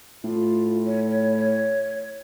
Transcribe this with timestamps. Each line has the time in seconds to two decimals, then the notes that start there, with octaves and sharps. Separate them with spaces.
0.24 A2 F4
0.86 C#5
1.08 C#5
1.37 C#5